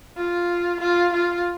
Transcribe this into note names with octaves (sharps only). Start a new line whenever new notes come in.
F4
F4
F4